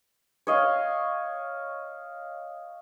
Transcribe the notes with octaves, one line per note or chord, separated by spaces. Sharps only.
C#5 D#5 F5